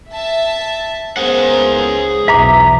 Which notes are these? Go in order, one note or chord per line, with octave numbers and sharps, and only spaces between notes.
E5 A5
C#2 A#3 B3 G#4 C5 F#5
B1 E2 E3 E5 A#5 D6